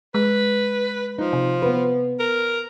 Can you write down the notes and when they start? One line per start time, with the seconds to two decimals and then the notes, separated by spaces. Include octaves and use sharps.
0.14 G#3 B4
1.19 F3 D#4
1.33 C3
1.62 B3 B4
2.19 A#4